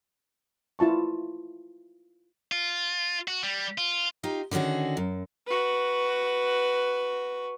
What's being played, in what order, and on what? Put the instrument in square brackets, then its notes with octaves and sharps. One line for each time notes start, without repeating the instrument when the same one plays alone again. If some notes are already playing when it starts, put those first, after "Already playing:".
[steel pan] E4 F4 A5 C#6
[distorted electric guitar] F4
F#4
G3
F4
[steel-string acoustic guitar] D#4 F4 G4
D3 D#3 C#4 F#4 G#4
F#2
[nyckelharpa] F#4 B4